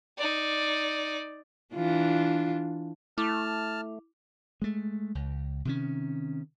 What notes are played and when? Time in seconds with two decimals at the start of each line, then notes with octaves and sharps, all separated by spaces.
0.17 D#4 D5
1.74 E3 D4 F4
3.18 A3 E4 A5 D6 F6 F7
4.62 G#3 A3
5.15 C#2
5.65 C3 D#3 C#4